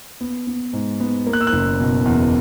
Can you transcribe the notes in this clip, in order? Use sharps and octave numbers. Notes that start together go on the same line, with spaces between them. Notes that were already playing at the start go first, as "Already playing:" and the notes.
B3
B3
G#2
B3
A#3
F#6
E6
F#6
F#1
B2
E2